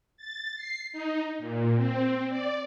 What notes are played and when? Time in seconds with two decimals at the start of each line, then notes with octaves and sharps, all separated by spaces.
0.17 A6
0.56 C7
0.92 D#4
1.39 A#2
1.76 C4
2.29 D5